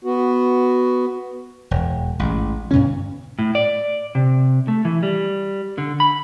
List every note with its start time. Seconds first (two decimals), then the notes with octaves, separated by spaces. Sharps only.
0.04 B3 F#4
1.71 E1
2.19 A1 G#2
2.71 G2 B2 D3 C#4
3.39 A2
3.55 D5
4.15 C3
4.68 A3
4.85 E3
5.03 G3
5.78 D3
6.00 B5